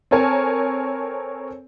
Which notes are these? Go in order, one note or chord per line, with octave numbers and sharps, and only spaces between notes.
C4 A4 A#4 C#5 G#5 A5